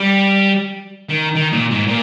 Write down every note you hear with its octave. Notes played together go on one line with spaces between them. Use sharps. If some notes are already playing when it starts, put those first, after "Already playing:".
Already playing: G3
D#3
D#3
A#2
G#2
A#2